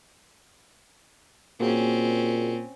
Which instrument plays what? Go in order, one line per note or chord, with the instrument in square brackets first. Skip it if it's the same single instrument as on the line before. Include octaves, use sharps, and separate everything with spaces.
[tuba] A#2 [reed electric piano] A#3 F#4 G#4 [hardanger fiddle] C4 C#4